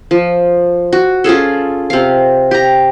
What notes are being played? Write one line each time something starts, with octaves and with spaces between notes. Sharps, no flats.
F3
F#4
C#4 F4 G#4 A4
C3 F5
G4 A#5